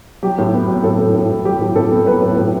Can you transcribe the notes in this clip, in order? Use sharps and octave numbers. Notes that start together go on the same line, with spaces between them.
F#3 G4
A2
B3
F#3
A2 A4
A2
A2
F#3
F#3 G4
A2
A2 A4
B3
F#3 B4
A2
A2